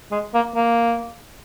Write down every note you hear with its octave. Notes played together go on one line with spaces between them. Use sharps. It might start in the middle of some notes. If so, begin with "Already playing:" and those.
G#3
A#3
A#3